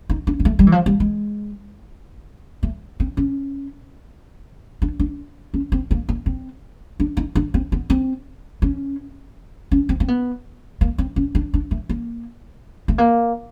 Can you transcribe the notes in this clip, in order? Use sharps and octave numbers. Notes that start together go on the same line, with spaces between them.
D#4
D4
A#3
A3
G3
E3
F3
G3
G#3
A3
C4
C#4
D4
D4
C#4
C4
A#3
A#3
C4
D4
D#4
D4
C4
B3
C4
C#4
C#4
C4
C4
B3
A#3
C4
C#4
D4
D4
A3
A#3
A3
A#3